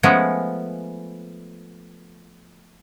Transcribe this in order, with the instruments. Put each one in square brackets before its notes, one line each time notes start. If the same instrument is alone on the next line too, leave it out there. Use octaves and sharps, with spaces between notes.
[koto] F3 G#3 A3 B3 C#4